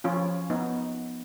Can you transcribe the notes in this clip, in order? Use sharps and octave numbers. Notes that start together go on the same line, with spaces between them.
F3 C#4 F4
B3 D#4